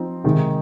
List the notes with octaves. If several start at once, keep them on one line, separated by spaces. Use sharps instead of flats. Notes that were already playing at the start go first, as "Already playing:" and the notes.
Already playing: F3 C4 D#4
C3 D#3 G#3 D#4